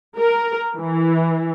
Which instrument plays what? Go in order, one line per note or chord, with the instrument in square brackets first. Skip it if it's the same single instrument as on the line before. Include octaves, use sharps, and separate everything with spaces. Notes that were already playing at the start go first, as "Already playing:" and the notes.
[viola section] A#4
E3